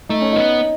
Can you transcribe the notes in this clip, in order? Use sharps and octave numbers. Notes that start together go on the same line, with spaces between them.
A3 D#4
C#4
B3 D#4